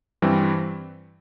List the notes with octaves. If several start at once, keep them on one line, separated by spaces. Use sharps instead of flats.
G2 E3 G3 C4